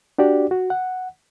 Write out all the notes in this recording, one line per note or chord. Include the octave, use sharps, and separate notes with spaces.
D4 F#4 G4 D5
F#4
F#5